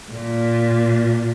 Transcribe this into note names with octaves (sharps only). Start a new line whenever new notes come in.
A#2